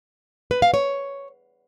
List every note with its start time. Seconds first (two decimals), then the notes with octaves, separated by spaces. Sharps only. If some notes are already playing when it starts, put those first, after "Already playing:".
0.51 B4
0.62 F5
0.74 C#5